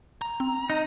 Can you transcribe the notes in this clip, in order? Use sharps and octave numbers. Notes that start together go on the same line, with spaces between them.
A#5
C4
D#4